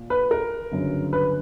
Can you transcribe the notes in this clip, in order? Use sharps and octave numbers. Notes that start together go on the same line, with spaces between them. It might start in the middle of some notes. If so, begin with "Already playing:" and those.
Already playing: A#2
B4
A#4
G1 F#2 C#3
B4